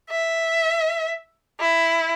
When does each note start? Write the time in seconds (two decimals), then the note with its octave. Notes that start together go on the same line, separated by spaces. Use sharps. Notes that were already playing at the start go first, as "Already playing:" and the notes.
0.10 E5
1.60 E4